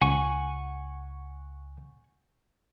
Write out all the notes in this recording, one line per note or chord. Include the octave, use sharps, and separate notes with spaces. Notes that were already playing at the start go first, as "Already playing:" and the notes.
C#2 F#5 G#5 C#6